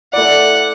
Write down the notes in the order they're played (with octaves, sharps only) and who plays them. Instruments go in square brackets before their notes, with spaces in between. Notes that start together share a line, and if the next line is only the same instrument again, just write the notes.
[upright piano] A3 E4 D5 [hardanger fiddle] F#5